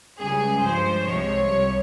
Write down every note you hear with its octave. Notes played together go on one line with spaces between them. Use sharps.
C#2 C#3 G3 G#4
G2 F3 G#3 C5
C2 C3 F3 G#3 C#5
C2 C3 G3